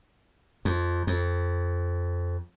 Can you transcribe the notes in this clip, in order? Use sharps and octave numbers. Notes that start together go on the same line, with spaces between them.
F2
F2